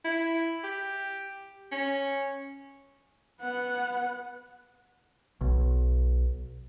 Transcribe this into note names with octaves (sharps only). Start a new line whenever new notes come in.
E4
G4
C#4
B3 F#5
B1